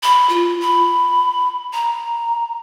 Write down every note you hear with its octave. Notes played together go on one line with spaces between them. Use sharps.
B5
F4
B5
A#5